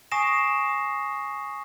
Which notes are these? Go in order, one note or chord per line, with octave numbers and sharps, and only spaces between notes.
G#5 C#6 D#6 A#6 C7 E7